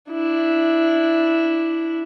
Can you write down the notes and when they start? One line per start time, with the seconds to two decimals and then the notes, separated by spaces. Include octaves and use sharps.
0.12 D4 E4